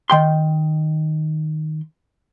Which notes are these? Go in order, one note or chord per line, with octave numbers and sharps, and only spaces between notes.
D#3 G5 C6